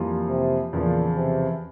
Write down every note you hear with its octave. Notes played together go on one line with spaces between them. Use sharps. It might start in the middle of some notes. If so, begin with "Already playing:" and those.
Already playing: F2 E3 G3 A#3 F4
C3
E2 A#2 C#3 F3
C3